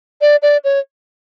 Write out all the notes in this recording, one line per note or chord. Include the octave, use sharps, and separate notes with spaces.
D5
D5
C#5